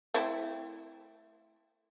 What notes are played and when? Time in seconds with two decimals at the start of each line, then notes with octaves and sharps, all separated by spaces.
0.14 A3 C4 E4